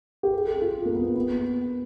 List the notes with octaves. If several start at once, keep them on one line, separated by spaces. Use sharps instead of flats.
G4
G#4
A4
F4
A#3
B3
B3
B3